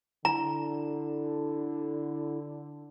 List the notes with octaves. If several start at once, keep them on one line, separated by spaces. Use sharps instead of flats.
D3 E4 A#5